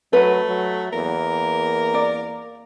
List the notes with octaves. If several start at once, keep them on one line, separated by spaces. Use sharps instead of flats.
F#3 A3 B4
F#3
E2 A#3 A#4
D5